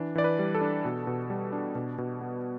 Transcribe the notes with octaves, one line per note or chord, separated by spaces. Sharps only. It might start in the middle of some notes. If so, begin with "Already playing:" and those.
Already playing: E3 D4
E3 D5
B4
G3
A4
D4
B2
B2
G3
D4
B2
B2
B3